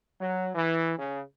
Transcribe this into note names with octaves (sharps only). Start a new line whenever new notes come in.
F#3
E3
C#3